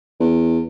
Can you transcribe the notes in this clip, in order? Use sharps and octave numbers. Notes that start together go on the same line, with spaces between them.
E2